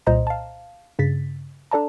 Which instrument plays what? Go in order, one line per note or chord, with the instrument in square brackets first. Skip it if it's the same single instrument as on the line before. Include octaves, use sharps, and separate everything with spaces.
[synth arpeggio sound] C2 A#2 C5 D#5 A#5 A#6
F5 A5
G2 C#3 A6 B6
D4 A4 D5 A5 A#5